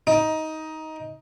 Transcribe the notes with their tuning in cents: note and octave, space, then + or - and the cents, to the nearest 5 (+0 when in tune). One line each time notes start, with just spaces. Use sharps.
D#4 +15